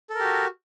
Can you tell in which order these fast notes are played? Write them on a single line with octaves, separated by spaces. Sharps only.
A4 A#4 G4 F#4